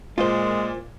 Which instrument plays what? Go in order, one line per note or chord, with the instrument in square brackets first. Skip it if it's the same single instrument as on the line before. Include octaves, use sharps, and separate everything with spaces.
[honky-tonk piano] A#2 [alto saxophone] G#3 [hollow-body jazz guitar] F4 C5